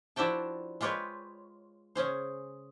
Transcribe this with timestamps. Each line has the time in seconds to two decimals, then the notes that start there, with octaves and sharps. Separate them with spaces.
0.16 F3 D4 E4 F#4 G5 A5
0.81 G#3 F4 G4 B4 C#5
1.95 C#3 C#4 G#4 C5